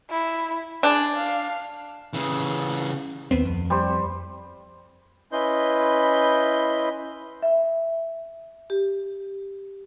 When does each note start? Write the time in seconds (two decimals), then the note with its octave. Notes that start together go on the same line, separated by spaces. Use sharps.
0.10 E4
0.83 D4 G#4
1.16 F5
2.13 C#3 E3
3.31 D#2 B3 C4
3.45 F2
3.70 G3 C5
5.32 C#4 E4 B4 D#5 C6 G6
7.43 E5
8.70 G4